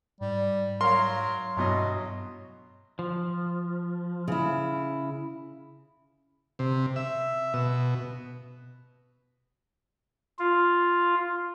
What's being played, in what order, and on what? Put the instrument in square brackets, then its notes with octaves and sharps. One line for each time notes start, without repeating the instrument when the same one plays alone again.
[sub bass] G#2 [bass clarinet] G3
[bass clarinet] F#3 [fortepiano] A#4 F5 [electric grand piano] C6
[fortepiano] A1 B2 D#5 [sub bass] G2 [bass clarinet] F#3
[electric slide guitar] F3
[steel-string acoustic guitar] C#3 E4
[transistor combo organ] C3
E5
B2
[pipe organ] F4